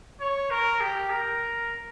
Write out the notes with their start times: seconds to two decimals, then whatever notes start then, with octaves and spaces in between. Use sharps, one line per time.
0.20 C#5
0.50 A#4
0.80 G4
1.10 A#4